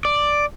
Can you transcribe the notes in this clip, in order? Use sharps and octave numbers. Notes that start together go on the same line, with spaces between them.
D5